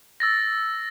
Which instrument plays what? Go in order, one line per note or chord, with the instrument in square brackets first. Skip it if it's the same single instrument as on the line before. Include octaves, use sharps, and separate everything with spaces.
[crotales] E6 A6 A#6